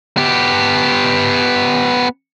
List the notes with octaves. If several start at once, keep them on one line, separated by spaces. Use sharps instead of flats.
B3 G4